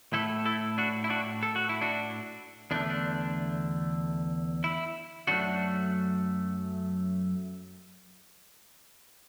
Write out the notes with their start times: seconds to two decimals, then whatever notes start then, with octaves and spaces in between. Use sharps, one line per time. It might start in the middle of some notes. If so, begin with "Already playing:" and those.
0.13 A2 A3 E4 A4
0.45 E4 A4
0.78 D4 F#4
1.04 E4
1.10 D4 F#4
1.43 A4
1.56 F#4
1.69 E4
1.81 D4 F#4
2.71 E2 D3 A3 D4
2.90 D4
4.64 E4
5.27 F#2 F#3 A3 D4 F#4